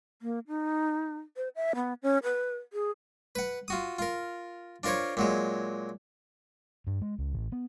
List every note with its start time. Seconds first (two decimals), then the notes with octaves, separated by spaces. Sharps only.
0.22 A#3
0.48 D#4
1.37 C5
1.56 E5
1.75 B3
2.03 C#4
2.23 B4
2.73 G#4
3.35 B4 F#5
3.68 F4 F#4 D#6
3.99 F4 A#4
4.83 D4 F4 A#4 C5 C#5
5.17 A#2 F#3 G#3
6.87 G2
7.01 G#3
7.18 C#2
7.33 A1
7.52 B3